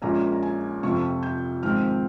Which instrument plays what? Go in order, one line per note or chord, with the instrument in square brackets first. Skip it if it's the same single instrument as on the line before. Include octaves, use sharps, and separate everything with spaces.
[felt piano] A#1 A#2 G#3 C#4 A#5
A#5
G#5
F2 C3 F3 C4 F4 C#6
G6
G#1 G#2 F3 G#3 C4 F6